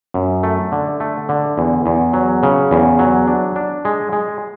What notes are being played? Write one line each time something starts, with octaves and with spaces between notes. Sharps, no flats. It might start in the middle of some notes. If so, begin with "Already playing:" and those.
F#2
A3
D3
A3
D3
E2
E2
F#3
C#3
E2
F#3
D4
D4
G#3
G#3